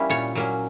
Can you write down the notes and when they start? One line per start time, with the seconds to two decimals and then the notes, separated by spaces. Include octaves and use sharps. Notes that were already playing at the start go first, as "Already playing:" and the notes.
Already playing: G3 A#3 C#4 E4
0.10 A#2 C#5
0.35 F#3 A#3 C#4